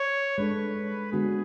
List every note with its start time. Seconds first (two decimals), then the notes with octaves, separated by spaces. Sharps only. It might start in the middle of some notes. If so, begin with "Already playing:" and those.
Already playing: C#5
0.38 G#3 D4 A4 B4
1.13 D3 G#3 B3 D4 F#4 G#4